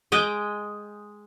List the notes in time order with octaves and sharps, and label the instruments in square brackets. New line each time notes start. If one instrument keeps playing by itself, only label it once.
[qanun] G#3 D#5 G5